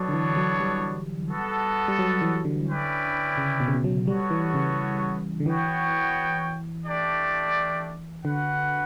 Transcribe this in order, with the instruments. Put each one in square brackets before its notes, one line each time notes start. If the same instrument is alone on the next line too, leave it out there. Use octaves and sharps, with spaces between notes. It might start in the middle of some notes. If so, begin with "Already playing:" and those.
Already playing: [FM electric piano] F#3 [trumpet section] B3 D4 A4 C#5
[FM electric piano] D3
E3
F#3
G3
[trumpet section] B3 F#4 A4
[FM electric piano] G3
F#3
E3
D3
[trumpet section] C#4 E4 B4 D5 G5
[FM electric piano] C#3
B2
C#3
B2
F#3
[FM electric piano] G3 [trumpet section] B3 F#4 A4 C#5
[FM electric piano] E3
C#3
D3
[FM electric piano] E3 [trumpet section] B3 F#4 C#5 G5
[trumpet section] A3 D4 G4 D5
[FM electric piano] D3 [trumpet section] F#4 B4 F#5